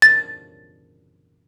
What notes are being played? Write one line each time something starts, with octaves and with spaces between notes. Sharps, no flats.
A6